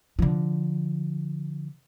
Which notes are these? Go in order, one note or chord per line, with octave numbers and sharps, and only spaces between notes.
D3 F3